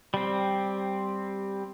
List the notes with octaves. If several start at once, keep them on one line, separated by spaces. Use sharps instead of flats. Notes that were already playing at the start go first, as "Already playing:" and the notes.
G3 C4